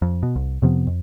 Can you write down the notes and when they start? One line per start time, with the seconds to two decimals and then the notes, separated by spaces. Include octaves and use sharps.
0.02 F2
0.23 B2
0.36 C2
0.62 F2 C3 F3 B3
0.87 F2